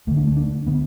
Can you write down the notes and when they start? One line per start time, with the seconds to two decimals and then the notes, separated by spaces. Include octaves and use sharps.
0.07 D2 A3
0.11 D3
0.17 D4
0.27 A3
0.37 D4
0.67 D3 B3